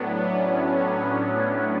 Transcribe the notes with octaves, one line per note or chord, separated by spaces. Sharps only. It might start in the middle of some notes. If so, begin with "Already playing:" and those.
Already playing: A2 F#3 B3 D4
C#4